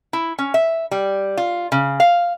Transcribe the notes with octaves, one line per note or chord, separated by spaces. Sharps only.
E4
C#4
E5
G3
F4
C#3
F5